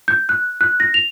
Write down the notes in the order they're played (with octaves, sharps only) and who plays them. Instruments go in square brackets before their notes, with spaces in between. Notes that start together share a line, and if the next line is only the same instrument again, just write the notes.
[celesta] G6
F#6
F#6
A#6
F7